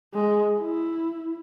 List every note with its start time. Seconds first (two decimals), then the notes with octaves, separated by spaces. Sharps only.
0.14 G#3
0.58 E4